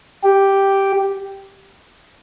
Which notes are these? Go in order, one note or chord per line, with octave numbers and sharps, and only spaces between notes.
G4